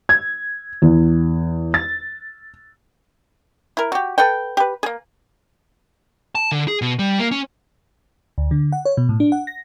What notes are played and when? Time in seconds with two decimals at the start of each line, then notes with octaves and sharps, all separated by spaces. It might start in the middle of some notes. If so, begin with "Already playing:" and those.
0.09 G#6
0.82 E2
1.74 A6
3.77 E4 A#4
3.92 F#4 G4
4.18 A4 B4 F#5 G5
4.57 G4 B4
4.83 A#3 G#4
6.35 A5
6.52 D3
6.68 G#4
6.82 B2
6.99 G3
7.19 A#3
7.31 C#4
8.38 D2
8.51 D3
8.72 F#5
8.85 C#5
8.97 B2
9.09 A2
9.20 D4
9.32 F#5
9.47 A#6